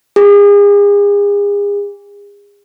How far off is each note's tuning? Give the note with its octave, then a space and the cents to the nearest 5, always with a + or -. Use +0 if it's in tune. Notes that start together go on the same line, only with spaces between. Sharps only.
G#4 -35